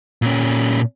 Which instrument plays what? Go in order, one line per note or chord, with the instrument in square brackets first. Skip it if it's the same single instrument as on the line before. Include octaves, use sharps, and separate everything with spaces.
[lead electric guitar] A#2 C#4